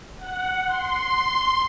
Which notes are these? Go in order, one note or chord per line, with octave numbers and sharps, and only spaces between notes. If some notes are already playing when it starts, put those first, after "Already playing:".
F#5
C6